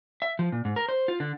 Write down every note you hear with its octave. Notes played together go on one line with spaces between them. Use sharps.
E5
F3
A#2
G#2
A#4
C5
F4
D3